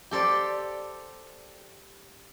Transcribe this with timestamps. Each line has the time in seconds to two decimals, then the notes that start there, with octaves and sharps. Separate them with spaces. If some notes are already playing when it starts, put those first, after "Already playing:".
0.11 G4 A4 C5 D5